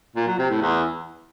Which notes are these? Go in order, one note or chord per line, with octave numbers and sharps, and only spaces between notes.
A#2
F#3
C3
A2
E2